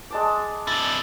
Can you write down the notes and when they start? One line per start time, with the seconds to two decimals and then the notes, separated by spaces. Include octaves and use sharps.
0.10 G#3 A5 D6
0.67 D4 E4 A6